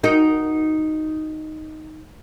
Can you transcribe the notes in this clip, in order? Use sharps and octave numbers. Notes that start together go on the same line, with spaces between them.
D#4 F#4 A#4